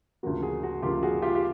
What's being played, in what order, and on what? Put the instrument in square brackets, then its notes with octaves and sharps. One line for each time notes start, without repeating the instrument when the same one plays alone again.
[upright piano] D2 C#3 F3 A#3 F#4
F#4 G#4
F#4
D2 C#3 F3 A#3 F4 G4
F#4 G#4
F4 G4
G4